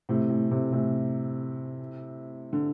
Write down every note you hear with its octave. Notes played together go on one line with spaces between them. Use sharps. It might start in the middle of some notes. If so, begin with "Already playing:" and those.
A2 C3
A2
A2 C3
A2 C3
D3